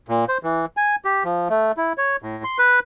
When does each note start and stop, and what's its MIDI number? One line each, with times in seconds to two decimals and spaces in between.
0.09 0.25 46
0.29 0.38 72
0.43 0.65 52
0.77 0.96 80
1.05 1.24 67
1.24 1.48 53
1.50 1.72 57
1.77 1.93 64
1.98 2.16 73
2.23 2.44 45
2.44 2.58 84
2.59 2.80 71